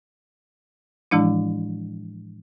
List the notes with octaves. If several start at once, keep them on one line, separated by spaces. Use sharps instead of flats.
A2 E3 F3 G#3 D4 E4